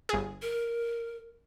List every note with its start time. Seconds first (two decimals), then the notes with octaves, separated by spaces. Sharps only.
0.09 G1 G#4
0.42 A#4